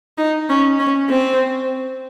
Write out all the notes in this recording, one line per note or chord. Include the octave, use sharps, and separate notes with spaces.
D#4
C#4
C#4
C4